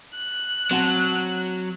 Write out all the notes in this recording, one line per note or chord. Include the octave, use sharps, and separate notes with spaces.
F#6
F#3 C4 F#5 A5